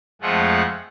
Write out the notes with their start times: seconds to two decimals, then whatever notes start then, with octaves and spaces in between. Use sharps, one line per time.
0.22 F2 F3 G#3 A3 F4 F#5